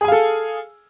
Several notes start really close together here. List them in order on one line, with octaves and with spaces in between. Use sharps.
G#4 G#5 F5 A4